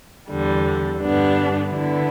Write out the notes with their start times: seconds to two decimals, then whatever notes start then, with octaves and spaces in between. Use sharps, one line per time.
0.30 E2 D3 G3
1.00 G2 D3 G3 B3 D4
1.71 D3 B3 E4